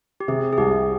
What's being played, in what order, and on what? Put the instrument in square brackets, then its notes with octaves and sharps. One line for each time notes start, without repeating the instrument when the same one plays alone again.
[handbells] G4
[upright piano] C3 [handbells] G#4
[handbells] G#4
[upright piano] C2 [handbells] G4